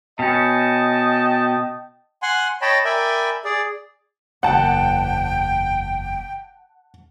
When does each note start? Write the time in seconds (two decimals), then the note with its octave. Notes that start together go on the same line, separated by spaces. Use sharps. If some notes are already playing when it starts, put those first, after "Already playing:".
0.19 B2 C#4 D#5 G5 A5
2.22 F#5 G#5 C6
2.62 C#5 D#5 G5 A5 B5
2.85 A#4 D5 E5 G5 G#5 B5
3.45 G#4 D5
4.43 F#1 E2 F#5 G5 A5